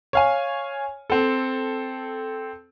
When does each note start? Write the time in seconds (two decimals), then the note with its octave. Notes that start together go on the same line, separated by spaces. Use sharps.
0.13 C#5 F5 G#5
1.10 C4 A4